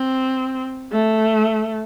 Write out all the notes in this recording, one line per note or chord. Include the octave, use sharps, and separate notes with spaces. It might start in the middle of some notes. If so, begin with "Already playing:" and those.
Already playing: C4
A3